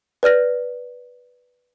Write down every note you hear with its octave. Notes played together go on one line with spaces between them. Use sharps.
B4 D5 F6 A#6